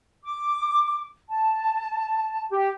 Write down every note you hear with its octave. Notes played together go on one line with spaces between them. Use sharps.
D6
A5
G4